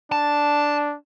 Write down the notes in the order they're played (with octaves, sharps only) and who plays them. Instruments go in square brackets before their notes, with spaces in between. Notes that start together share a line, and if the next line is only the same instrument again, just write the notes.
[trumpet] D4 [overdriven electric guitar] A5